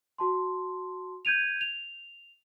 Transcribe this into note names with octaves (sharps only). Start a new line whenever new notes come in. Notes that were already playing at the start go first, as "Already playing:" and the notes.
F#4 A5 C6
G6 G#6 D#7 F7
F7